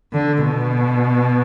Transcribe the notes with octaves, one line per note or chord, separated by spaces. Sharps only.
D3
B2